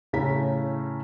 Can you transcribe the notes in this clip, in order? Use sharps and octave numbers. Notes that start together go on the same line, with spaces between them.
A2 C#3 C#4 A#5 B6